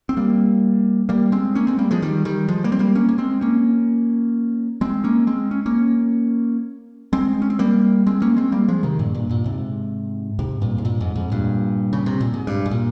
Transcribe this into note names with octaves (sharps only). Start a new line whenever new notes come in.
C4
G3 A#3
G3 A#3
G#3 C4
A#3 C#4
G#3 C4
G3 A#3
F3 G#3
D#3 G3
D#3 G3
F3 G#3
G3 A#3
C4
G3 A#3
A#3 C#4
A#3
G#3 C4
A#3 C#4
G#3 C4
A#3 C#4
G#3 C4
C#4
A#3 C#4
G#3 C4
C#4
C4
G3 A#3
G#3 C4
A#3 C#4
G#3 C4
G3 A#3
F3 G#3
C3 D#3
G2 A#2
G2 A#2
G2 A#2
G#2 C3
G#2 C3
G2 A#2
G#2
G2 A#2
F2 G#2
F2 G#2
G2 A#2
C#3
C3
A#2
G#2
G2
G#2
A#2